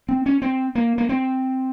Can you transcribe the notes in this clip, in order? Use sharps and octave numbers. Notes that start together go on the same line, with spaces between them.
C4
C#4
C4
A#3
A#3
C4